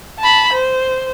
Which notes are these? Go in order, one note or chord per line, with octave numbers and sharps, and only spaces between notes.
A5 B5
C5